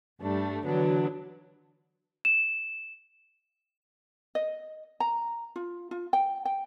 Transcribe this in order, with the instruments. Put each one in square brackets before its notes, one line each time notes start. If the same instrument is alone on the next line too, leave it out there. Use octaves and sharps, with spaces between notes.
[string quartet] G2 G3 A3 D4
D3 E3 F#3 B3 D4
[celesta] E7
[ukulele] D#5
A#5
F4
F4
G5
G5